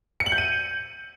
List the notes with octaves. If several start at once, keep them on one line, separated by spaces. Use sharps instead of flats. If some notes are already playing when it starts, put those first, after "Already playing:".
C#7
F#7
G6
D#7